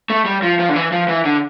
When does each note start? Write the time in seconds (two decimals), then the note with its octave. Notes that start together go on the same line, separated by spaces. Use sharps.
0.10 A3
0.26 G3
0.43 F3
0.59 F3
0.69 D3
0.76 E3
0.92 F3
1.08 E3
1.25 D3